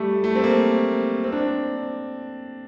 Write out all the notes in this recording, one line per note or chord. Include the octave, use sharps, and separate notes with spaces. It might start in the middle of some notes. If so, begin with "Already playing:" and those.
Already playing: G3 A3
A3
C4
A#3
C4
D4